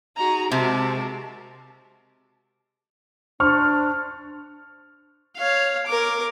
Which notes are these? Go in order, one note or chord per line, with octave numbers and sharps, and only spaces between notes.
D#4 F#4 G#4 A#5
C3 G#3 F#4 A#4 A5
D4 C5 C#6 F6
C#5 F5
A#4 D6